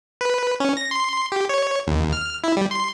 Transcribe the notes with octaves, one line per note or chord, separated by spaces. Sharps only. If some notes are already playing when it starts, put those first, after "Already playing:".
B4
C#4
A#6
C6
G4
C#5
D#2
F6
E4
G3
C6